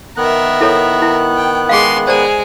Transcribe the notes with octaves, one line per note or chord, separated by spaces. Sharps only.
D#3 B3 A#4 E5 F#6
E4 A4 C#5
E4
G5
G#3 G#4 F5 C6
G#3 G#4 C5 D5 A#5